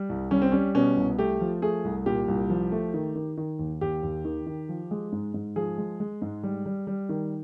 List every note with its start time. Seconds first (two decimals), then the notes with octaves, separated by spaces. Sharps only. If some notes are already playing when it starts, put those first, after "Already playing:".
Already playing: G3
0.09 C2
0.31 G3 C#4
0.42 C4
0.52 G3 C#4
0.75 B2 C#4
0.97 C2
1.18 A3 G4
1.41 F3
1.62 A3 G#4
1.84 C2
2.06 A#2 G4
2.28 C2
2.50 F3
2.72 A3
2.94 D#3
3.15 D#3
3.37 D#3
3.59 D#2
3.81 D#2 G4
4.03 D#2
4.25 D#3
4.46 D#3
4.69 F3
4.91 G#3
5.12 G#2
5.34 G#2
5.56 F3 G#4
5.78 G#3
6.00 G#3
6.22 G#2
6.43 G3
6.66 G3
6.87 G3
7.09 D#3